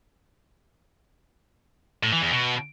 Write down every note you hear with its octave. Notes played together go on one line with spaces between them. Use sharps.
A2
E3
E2
B2